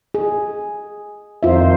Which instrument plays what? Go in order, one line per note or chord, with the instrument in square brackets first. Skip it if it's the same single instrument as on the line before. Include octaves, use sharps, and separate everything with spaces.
[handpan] G#4
[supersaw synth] F2 D#3 C5 [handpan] F4 E5